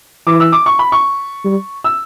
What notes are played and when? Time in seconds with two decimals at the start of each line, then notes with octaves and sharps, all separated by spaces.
0.27 E3 D6
0.40 E6
0.52 D6
0.66 C#6
0.79 B5
0.92 C#6
1.45 G3
1.84 E6